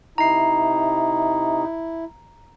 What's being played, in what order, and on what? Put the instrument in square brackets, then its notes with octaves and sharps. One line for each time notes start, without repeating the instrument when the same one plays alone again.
[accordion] C3 D#4 [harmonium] E4 [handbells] A#5 C7